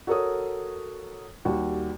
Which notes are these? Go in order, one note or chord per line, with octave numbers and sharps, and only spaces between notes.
F#4 A4 A#4 C#5 D#6
D#2 G3 F#4